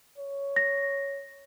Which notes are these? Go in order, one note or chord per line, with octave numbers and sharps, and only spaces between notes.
C#5
A#6